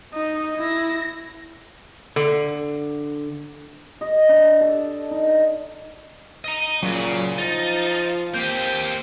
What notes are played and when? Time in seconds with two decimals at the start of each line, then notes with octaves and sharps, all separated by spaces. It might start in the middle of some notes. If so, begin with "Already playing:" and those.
0.14 D#4 D#5
0.57 E4 A#6
2.16 D3
4.01 D#5
4.29 D4
4.61 A4
5.11 D#4
6.45 D#5 A#5
6.83 A#2 C#3 F#3
7.38 F3 D#4 A6
8.34 A#3 C4 G4 G6